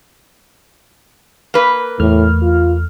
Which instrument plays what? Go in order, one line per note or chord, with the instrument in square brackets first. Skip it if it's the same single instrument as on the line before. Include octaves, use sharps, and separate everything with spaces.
[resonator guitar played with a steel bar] A#3 B4
[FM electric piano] E2 A3 F6 [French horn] A2
[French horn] F4